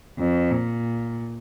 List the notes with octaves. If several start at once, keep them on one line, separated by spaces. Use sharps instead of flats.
F2
A#2